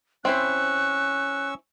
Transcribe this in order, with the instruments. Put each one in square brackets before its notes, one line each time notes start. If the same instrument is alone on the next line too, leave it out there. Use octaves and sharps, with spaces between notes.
[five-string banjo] C4 E4 C5 [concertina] C#4 C#6 E6 [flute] F#6